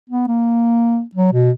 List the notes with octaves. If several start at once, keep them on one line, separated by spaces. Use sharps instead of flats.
B3
A#3
F#3
B2